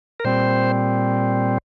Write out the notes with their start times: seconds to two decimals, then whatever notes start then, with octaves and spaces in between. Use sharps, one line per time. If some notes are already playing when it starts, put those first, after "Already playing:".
0.20 A#4
0.25 A#2 G3 C4 C5